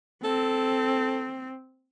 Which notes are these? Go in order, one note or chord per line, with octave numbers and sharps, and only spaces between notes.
C4 A4